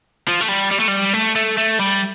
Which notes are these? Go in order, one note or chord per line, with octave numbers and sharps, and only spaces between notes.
F3
A3
G3
G3
A3
G3
A3
A3
A3
G3